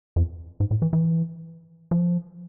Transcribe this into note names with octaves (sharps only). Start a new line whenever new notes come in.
F2
G#2
A2
E3
E3
F3